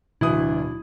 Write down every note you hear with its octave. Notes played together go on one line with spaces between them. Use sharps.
D1 B2 E3 D4 E4 D#6